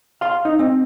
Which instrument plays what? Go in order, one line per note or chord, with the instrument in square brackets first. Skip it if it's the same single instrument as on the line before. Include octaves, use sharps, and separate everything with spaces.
[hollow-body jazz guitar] F5 C6
D#4
C4